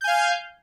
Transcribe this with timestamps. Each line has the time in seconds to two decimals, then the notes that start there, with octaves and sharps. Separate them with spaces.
0.01 G6
0.04 G#5
0.07 F5